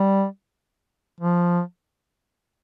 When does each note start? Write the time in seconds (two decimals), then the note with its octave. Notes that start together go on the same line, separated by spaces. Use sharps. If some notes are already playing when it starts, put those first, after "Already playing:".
Already playing: G3
1.20 F3